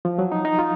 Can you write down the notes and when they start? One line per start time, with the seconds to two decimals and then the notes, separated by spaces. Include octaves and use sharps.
0.05 F3
0.19 F#3
0.32 D#4
0.45 D#4
0.59 F4